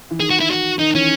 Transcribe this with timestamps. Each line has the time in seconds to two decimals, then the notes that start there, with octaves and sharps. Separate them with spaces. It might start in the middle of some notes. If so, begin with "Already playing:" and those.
0.11 E3
0.19 D#3 G#4
0.30 F#4
0.40 E4
0.51 F#4
0.79 D#3 D#4
0.94 E3 C#4